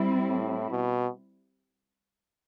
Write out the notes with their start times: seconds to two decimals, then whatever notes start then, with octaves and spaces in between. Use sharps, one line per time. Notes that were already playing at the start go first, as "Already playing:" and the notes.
Already playing: G3 C4 E4
0.29 A2
0.70 B2